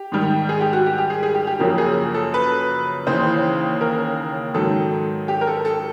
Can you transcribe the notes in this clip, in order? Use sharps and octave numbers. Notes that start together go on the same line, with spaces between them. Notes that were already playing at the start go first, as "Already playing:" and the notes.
Already playing: G4
G#2 D#3 G3
G#4
G4
F#4
G4
G4
G#4
G#4
G4
G4
F#2 C#3 F3 A#3 G4
G#4
A4
B4
D#2 C#3 E3 C5
A#4
G#2 D#3 F#3 A4
G4
A#4
A4
A4